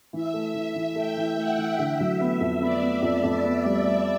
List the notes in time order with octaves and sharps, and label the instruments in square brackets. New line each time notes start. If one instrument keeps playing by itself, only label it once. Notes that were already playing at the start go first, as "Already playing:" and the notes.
[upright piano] E3 [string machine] E5
[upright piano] A3
E3
E3
[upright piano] A3 [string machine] G5
[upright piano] E3
[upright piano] A3 [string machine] F#5
[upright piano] E3
[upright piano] D3 [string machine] E5
[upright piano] F#3
B3
F2
[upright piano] B3 [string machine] D5
[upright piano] B3
F2
F2
B3
G3
G3